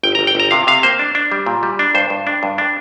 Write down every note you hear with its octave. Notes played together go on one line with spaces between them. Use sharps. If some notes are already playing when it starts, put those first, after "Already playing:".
G1 G5
A#5
G1
G5
G1 A#5
C3 F5
C3 F5
A#3 C5
D4
D4
G3
A#2
G3
D4
G2 C5
G2
D4
G2
D4